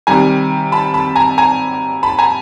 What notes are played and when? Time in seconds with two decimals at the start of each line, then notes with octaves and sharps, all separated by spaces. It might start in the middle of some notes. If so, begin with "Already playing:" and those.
0.07 C3 D#3 G3 G#5 A#5
0.72 A5 B5
0.94 A5 B5
1.16 G#5 A#5
1.38 G#5 A#5
2.03 A5 B5
2.18 G#5 A#5